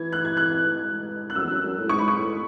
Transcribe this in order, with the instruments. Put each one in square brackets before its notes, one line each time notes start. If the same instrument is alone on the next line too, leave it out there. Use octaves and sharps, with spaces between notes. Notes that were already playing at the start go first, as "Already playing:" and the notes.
Already playing: [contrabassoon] E3 [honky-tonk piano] G#6
[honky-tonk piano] F#6
G#6
F#6
F#6
[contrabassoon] F#2 [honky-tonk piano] E6
[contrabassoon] E2
F#2
F#2
A2
[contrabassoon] G#2 [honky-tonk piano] C#6
[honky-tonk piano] B5
C#6
[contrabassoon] A2